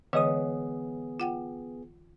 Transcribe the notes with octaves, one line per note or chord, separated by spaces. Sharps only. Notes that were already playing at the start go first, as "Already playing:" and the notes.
D3 E3 G#3 B3 G#4 C#5 D#5 D#6
F4 F#5 G5